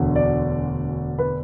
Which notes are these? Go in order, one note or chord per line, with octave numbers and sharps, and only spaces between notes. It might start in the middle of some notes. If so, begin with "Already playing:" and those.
Already playing: E1 D2 D3
D5
B4